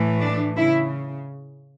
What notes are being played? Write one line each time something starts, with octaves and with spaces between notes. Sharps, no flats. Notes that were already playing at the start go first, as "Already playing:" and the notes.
Already playing: A2 E3 A3
D4
C#3 E4